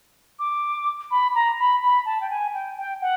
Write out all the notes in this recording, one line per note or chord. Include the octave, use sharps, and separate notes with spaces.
D6
B5
A#5
B5
B5
A5
G5
G#5
G5
G5
F#5